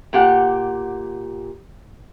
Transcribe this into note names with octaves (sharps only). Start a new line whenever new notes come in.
A#2 G4 F#5